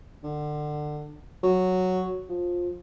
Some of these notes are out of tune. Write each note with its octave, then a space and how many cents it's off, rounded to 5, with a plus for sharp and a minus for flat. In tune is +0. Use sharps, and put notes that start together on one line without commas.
D3 +25
F#3 -5
F3 +15